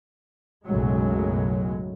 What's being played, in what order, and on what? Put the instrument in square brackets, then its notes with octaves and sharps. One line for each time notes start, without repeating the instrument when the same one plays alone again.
[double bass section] B1 F#2 A2 C#3 F#3 G#3